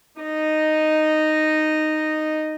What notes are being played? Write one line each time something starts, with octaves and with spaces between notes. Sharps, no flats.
D#4 D#5